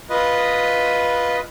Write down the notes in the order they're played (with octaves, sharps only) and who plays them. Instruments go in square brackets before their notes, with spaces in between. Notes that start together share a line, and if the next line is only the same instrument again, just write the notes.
[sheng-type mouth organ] F4 B4 D#5